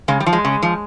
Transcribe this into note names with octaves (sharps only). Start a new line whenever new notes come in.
C#3 G#3
G3
F3
G#3
C#3
F3